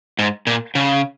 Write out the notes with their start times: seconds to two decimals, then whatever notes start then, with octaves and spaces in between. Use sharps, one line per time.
0.19 G#2
0.47 A#2
0.75 C#3